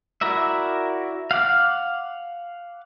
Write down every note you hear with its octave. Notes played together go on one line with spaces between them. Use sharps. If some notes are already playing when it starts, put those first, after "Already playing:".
E4 F#4 A#4 D5 E5
F5 F#5 D6 F6